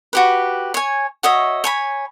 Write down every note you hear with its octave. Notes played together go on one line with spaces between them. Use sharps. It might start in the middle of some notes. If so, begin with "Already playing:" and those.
F#4 G4 B4
C#5 G#5
F#4 C#5 D#5 E5
C#5 G#5 B5